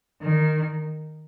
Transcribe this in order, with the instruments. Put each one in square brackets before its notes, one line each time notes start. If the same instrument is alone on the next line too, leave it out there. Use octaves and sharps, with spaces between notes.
[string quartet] D#3